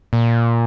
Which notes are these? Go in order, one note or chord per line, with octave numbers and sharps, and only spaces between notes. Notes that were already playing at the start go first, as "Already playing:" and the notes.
A#2